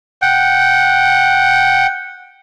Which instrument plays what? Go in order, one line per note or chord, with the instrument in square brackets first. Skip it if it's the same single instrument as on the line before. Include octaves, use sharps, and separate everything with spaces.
[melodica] F#5 G5